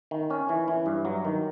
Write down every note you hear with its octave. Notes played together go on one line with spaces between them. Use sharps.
D#3
C#4
E3
E3
G2
F#3
D#3